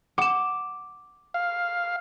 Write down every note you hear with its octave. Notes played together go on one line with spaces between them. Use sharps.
F#5 D6 E7
F5